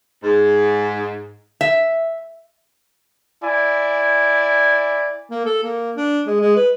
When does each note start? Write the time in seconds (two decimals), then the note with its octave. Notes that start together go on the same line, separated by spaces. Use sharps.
0.24 G#2
1.61 E5
3.43 E4 D5 G#5
5.30 A#3
5.45 A4
5.63 A#3
5.96 D4
6.27 G#3
6.41 G#3
6.56 B4